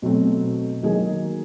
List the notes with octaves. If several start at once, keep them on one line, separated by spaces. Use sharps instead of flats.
B2 F#3 A3 C4
D#3 F#3 A#3 D#4 G#4